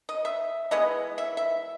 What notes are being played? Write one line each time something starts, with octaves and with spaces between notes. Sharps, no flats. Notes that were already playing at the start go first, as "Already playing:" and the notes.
D#5
E5
E3 G#3 B3 D#5
E5
E5